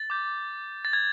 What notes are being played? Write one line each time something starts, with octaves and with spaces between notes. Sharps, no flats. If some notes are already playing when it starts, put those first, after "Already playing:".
Already playing: A6
D6 G6
A6
G#6